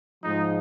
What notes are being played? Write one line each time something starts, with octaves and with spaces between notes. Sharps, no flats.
G#2 F3 G#3 D#4